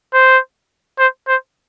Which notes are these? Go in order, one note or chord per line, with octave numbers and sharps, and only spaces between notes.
C5
C5
C5